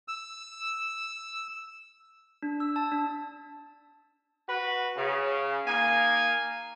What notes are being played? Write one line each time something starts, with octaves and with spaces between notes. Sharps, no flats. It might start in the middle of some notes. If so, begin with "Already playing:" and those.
E6
D4
E6
A5
D4
F#4 B4
C#3
A#3 D#4 G#5